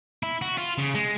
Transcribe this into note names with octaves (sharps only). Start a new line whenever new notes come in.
E4
F#4
F4
C#3
G#3